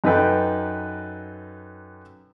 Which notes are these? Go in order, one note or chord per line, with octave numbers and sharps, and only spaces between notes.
F#2 D#4 A4 B4 G5